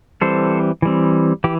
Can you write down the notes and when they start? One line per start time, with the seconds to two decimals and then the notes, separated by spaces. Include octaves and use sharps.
0.22 E3 G3 C4 A4 C5
0.82 E3 G3 C4
1.44 E3 G4